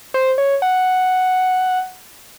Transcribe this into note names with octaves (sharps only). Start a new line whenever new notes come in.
C5
C#5
F#5